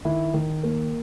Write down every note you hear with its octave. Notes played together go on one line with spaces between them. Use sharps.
D#3 E4
D#3
A#3